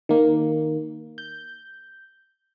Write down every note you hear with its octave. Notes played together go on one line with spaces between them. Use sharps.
D#3 A#3
G6